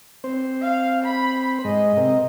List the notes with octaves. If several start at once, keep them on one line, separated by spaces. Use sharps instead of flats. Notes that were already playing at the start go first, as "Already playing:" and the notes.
C4 C5
F5
B5
G#2 G#3 D#5
C3 C4 A#4